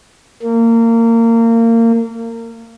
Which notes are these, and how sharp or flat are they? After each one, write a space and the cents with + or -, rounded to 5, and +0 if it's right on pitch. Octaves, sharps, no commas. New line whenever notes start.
A#3 -25